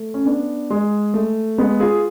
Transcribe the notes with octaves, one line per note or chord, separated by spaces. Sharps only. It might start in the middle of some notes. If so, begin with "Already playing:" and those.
Already playing: A3
C#4
B3 D4
G#3
A3
G#3 B3
F4 G#4